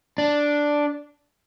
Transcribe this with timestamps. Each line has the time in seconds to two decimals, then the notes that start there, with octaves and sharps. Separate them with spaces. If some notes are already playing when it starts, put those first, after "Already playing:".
0.18 D4